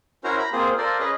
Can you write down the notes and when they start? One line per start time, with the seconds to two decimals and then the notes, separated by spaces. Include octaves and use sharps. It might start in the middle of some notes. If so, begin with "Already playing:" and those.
0.24 C#4 E4 F#4 A#4 C5 A#5
0.38 A#5 B5
0.52 A#3 C4 F4 G#4 C5
0.78 F4 A4 A#4 C5 D5
0.99 C#4 G#4 B4 D#5